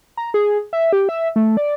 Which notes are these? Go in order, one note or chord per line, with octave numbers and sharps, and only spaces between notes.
A#5
G#4
E5
G4
E5
A3
D5